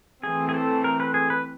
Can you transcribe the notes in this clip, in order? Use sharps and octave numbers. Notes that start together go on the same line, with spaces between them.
E3 A3 C4 G#4
G#4
A4
A#4
B4
G#4
B4